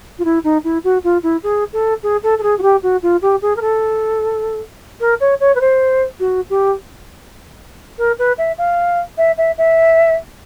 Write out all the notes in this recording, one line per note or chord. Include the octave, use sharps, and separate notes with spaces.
F4
E4
D#4
E4
F#4
F4
E4
G#4
A4
G#4
A4
A4
G#4
F#4
G4
F#4
F4
G4
G#4
A#4
A4
A#4
C#5
C#5
B4
C5
F#4
G4
A#4
B4
E5
F5
E5
E5
E5